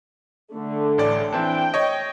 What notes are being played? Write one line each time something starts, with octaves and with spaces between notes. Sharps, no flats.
D3 A3
A1 D5
E3 C4 D4 G5
C#5 D#5